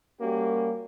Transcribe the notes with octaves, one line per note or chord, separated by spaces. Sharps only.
G3 A#3 C#4 F#4 G4